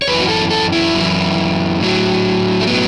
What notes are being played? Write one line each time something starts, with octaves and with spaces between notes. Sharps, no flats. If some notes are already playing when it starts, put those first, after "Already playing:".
C#5
F#2 E3 B4
F#4
A4
A4
E4
F#2 E3
A2 F#3
A3
A2 F#3 B3